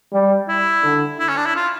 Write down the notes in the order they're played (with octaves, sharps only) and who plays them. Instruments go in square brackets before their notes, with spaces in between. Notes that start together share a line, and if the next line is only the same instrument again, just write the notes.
[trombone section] G3
[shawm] E4
[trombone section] D3
[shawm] E4
C#4
D4
E4
F4